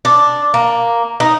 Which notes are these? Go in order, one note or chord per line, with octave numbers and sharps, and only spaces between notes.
D4
A#3
D#4